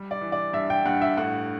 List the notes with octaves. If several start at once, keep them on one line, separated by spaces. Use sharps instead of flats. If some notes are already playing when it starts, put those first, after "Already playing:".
Already playing: G3
D5
E3
D5
G2 E5
G5
G2 F#5
E5
A2 F#5